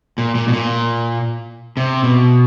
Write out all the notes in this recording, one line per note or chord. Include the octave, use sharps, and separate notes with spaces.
A#2
A#2
B2
A#2
C3
B2